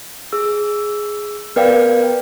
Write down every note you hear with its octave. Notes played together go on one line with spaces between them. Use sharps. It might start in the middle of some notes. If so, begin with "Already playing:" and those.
G#4 E6
B3 A#4 B4 D5 F5 G5